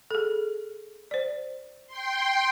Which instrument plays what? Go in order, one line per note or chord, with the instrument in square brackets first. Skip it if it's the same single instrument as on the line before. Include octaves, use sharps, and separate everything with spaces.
[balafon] G#4 A4
C5 D5
[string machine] G5 C6